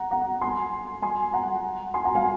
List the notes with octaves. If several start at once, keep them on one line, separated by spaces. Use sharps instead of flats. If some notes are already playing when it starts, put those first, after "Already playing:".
Already playing: F#5 A#5
F#5 A#5
G#5 C6
G#5 C6
F#5 A#5
G#5 C6
F#5 A#5
F5 G#5